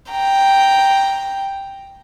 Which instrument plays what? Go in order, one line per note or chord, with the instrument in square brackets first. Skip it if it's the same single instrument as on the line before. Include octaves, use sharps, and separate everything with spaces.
[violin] G5 A#5